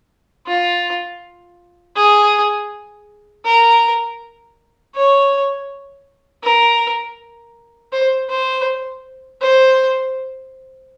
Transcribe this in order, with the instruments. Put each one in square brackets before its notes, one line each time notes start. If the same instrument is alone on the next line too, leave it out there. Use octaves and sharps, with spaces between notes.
[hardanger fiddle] F4
G#4
A#4
C#5
A#4
C5
C5
C5